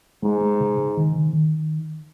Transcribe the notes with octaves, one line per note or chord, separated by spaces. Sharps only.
G#2 G#3
G#3
C#3
C#3
D#3
D#3
D#3